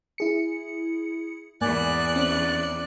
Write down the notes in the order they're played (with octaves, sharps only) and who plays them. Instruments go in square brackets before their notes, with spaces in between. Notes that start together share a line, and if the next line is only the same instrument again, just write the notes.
[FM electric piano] E4 G#4 C#7
[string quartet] E2 F#6 [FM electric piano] G#2 A#3 G#5 [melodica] D5
[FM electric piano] C4 C#4